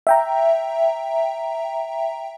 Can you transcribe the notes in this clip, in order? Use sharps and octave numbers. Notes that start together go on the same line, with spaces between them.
E5 G5 A#5